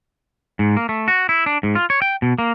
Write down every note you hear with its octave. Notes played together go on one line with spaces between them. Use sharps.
G#2
A#3
A3
F#4
E4
D4
G#2
F4
C#5
G5
B2
A#3